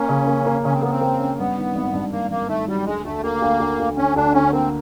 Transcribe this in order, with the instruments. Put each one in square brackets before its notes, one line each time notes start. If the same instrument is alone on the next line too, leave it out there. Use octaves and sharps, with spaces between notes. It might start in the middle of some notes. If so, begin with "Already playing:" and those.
Already playing: [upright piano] A#3 [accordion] C#4
[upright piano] C#3
A#3
A#3
[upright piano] C#3 [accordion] C#4
[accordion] C4
[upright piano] A#3 [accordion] B3
[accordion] C4
[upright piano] A#3
C#4
[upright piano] G2 [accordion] B3
[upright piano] D#3
G#1
G2
[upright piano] G#1 [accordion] A#3
[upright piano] G#1 [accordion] A#3
[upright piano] D#3 [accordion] A3
[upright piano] F#3 [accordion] G3
[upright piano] D2 [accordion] G#3
[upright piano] D2 [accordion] A3
[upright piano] D2 [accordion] A#3
[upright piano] D2
D2
D2
[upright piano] D3 [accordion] C#4
[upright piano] D2 [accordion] D4
[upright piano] D3 [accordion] C#4
[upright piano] A#3 [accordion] C4